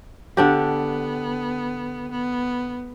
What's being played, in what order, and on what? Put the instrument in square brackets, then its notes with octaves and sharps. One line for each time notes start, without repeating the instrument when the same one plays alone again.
[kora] D3 D4 G4 [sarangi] B3
[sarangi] B3